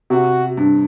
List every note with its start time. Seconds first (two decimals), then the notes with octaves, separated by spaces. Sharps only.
0.10 C3 F#4
0.57 G2